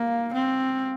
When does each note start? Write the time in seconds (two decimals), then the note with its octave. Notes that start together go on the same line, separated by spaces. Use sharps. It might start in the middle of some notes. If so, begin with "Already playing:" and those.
Already playing: A#3 F5
0.34 C4